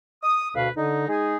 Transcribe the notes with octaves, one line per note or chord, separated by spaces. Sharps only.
D#6
D2 B2 B4 F5
D3 D#4
G#3 D#4 G#4